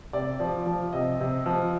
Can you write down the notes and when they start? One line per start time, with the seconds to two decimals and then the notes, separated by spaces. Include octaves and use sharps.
0.13 C3 D5
0.40 F3
0.66 F3
0.93 C3 D#5
1.20 C3
1.46 F3